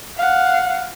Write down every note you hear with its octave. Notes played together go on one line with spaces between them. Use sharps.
F5 F#5